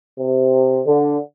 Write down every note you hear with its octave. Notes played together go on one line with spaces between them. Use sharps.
C3
D3